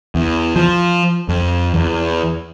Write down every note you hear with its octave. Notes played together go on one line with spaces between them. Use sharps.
E2
F3
F2
E2